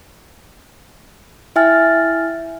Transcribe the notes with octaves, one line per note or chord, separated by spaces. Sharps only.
E4 E5 G5 G#5 F6 A6